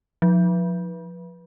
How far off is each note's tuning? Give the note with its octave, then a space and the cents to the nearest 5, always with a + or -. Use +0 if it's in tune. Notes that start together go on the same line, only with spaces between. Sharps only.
F3 +25